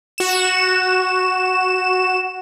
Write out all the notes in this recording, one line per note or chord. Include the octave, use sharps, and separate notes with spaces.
F#4 E7